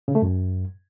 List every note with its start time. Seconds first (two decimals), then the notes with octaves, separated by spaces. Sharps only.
0.08 C#3
0.15 A3
0.22 F#2